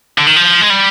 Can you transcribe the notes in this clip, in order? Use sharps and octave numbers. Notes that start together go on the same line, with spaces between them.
D3
D#3
F3
G#3
G3